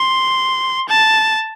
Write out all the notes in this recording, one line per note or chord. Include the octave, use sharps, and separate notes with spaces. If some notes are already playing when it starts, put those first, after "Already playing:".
Already playing: C6
A5